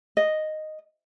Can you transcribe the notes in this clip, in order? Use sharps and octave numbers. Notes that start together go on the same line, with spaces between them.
D#5